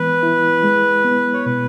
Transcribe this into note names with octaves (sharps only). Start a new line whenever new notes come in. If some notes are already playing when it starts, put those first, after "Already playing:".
Already playing: E3 G#3 B3 B4
E4
G#3
B3
C#5
B2 B4